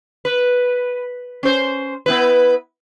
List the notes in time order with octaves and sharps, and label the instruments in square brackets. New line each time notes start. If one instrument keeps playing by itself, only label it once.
[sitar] B4
C#4 C5
B3 E4 B4